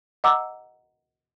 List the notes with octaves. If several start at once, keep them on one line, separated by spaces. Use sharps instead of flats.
D#5 F#5 A#5 D6 E6